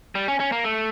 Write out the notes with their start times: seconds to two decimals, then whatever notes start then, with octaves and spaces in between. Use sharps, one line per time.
0.15 G3
0.28 C#4
0.40 C#4
0.52 A#3
0.64 A3